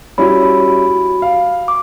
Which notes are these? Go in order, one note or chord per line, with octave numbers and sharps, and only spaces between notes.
G3 C#4 E4 F#4 B5
F5
D6